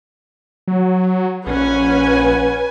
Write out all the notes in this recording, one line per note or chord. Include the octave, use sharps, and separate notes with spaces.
F#3
A#1 C#4 B4 F#5 G#5